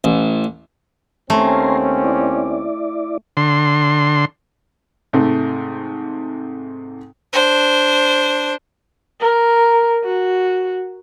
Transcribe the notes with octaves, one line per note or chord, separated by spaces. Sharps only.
A1
D#2 A3 C4 C#4 G#5 A#5 C6
E4 D5
D3 C6
G#2 C3 A3
D4 C5
A#4
F#4